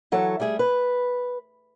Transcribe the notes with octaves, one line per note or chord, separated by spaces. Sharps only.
E3 F#3 A4 C#5
G3 A3 G#4 E5
B4